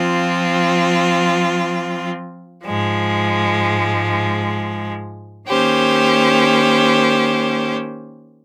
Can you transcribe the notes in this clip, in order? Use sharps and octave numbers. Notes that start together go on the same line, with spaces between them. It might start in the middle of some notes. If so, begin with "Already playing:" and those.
Already playing: F3 C4 F4
G#2 F3 G#3
D#3 A#3 C#4 G4 C5